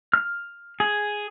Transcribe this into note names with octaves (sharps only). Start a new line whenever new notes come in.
F6
G#4